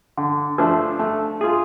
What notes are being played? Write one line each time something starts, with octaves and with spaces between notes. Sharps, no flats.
D3
F3 A3 D4
A3
F4 G#4